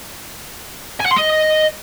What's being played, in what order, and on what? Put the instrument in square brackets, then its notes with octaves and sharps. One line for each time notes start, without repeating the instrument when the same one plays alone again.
[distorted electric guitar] G#5
F#5
C6
D#5